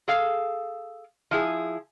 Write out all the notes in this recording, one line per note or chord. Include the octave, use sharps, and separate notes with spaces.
G#4 A4 F5
F3 E4 G#4